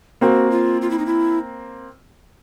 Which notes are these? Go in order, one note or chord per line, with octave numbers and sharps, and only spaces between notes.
A#3 C4 F#4
F4
F4
E4
D#4
E4